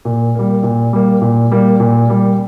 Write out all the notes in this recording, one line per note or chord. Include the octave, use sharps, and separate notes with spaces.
A#2
G3 A#3
A#2
G3 A#3
A#2
G3 A#3
A#2
G3 A#3